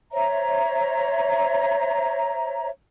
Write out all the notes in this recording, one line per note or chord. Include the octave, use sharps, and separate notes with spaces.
C5 C#5 E5 A#5